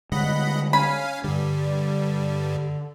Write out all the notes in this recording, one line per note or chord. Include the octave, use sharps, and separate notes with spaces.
D3 G3 G#3 D#5 F#5 B5
C#4 F5 G#5 B5
G2 D3 G3